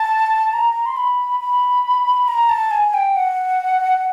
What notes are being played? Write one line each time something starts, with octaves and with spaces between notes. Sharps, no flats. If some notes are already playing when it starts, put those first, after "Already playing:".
Already playing: A5
A#5
C6
B5
B5
A#5
A5
G#5
G5
F#5